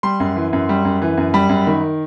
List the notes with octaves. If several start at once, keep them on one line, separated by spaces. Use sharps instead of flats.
G3 C6
F#2
E3
F#2
G3
F#2
E3
F#2
G3 B5
F#2
D#3